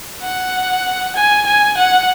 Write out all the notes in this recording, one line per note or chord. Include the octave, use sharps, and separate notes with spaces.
F#5
G#5
G#5
F#5